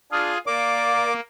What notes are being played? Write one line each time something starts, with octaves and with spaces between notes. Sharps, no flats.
D4 F4 G#4 D#6 F6
A#3 A#4 D5 F5 D6